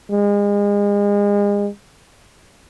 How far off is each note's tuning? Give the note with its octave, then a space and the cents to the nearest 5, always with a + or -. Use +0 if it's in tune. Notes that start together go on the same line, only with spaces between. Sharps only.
G#3 -35